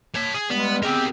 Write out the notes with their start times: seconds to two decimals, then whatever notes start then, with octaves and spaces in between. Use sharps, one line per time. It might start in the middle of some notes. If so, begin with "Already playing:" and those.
0.15 C#5 A5
0.34 G#4
0.50 G2 G3 G#3 B3
0.83 G#3 B3 C4 G4 A#4